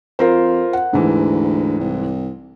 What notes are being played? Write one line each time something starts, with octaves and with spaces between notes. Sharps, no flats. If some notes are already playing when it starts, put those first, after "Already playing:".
F2 F4 A#4 C5
F#5
D2 G#2 E3
C2